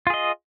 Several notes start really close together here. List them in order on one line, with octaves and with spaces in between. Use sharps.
F4 G#4 D#5